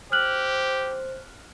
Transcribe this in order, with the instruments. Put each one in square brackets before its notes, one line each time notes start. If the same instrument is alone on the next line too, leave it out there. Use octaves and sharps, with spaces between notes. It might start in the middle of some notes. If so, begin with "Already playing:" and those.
[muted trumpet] G4 [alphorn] C5 [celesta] F6 F#6 F#7